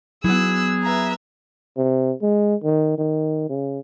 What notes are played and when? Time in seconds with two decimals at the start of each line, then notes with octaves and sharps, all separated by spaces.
0.24 F#3 B3 E4 G#4 E6 F#6
0.84 B4 E5 A#5
1.77 C3
2.22 G#3
2.63 D#3
2.98 D#3
3.50 C#3